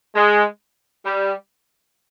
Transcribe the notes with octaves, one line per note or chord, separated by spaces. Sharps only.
G#3
G3